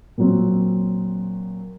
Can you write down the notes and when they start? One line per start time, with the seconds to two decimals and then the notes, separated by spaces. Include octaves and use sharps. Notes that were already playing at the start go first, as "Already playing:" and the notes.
0.18 A#2 F#3 C4